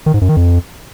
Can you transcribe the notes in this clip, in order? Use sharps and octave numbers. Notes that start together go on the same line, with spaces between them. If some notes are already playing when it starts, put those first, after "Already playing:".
D#3
G#2
F#2
D#3
F2